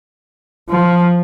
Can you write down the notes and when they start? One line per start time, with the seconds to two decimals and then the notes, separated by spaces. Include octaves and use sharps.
0.69 F3